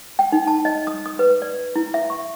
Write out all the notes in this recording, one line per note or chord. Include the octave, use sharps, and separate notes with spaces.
G5
D#4
A5
D#5
D#6
D#6
B4
D5
E4
E5
C#6